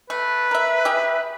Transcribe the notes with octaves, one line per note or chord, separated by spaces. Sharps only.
A3 B4
A#4 E5
G4 G#4 E5